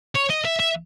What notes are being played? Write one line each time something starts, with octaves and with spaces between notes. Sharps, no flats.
C#5
D#5
E5
E5